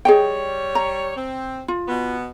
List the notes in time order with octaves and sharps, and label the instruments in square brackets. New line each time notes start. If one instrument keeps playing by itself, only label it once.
[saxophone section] G3 C#5 [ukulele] G#4 D#5 G5
[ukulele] A#5
[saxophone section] C4
[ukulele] F4
[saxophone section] B2 B3